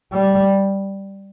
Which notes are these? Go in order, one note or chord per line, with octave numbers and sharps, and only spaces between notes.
G3